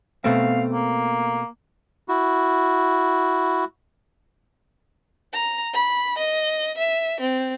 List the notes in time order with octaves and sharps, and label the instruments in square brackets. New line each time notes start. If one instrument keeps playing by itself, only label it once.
[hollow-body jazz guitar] B2 A3 C4 [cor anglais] F5
[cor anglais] A#3
[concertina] E4 F#4
[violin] A#5
B5
D#5
E5
C4